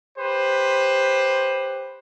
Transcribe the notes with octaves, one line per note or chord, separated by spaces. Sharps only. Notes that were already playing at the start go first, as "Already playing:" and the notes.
G4 B4 C5